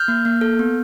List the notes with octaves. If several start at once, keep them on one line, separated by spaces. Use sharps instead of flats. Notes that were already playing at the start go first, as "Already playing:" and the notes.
Already playing: F6 G6
A#3
A#3
A4
B3